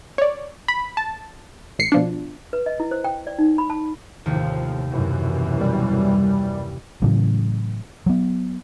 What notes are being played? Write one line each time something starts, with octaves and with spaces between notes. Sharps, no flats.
C#5 D5
B5
A5
A1 C7 C#7
B2 F3 D4
B4
D#5
E4
C5
G5
D5
D#4
B5
A5
D#2 A2 C3 F3
F#2 B2 E3
G3
A2 C#3 E3 F#3
F#3 B3